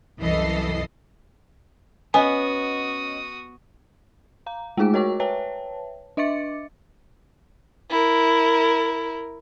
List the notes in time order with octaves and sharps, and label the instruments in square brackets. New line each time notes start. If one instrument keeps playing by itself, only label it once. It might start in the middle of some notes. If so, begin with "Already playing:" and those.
[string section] C2 F#2 E3 A4 D#5 C7
[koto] B3 [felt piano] C#4 D#5 [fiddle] F#4 D#6 [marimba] G#5
[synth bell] F5 A#5
G#3 A3 D#4 G#4 D6 D7
F#4 A#4 C#5 G5 C#6 D6
B4 C#5 E5 G5 A5
D4 D#5 E5 D6 A6 C#7
[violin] E4 A#4